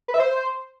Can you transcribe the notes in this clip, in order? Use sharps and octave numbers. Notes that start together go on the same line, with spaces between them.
B4
E5
C5